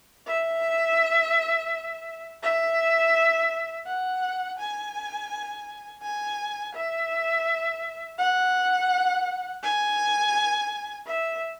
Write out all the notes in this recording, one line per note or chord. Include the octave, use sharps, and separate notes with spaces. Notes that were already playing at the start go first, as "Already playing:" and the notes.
E5
E5
F#5
G#5
G#5
E5
F#5
G#5
E5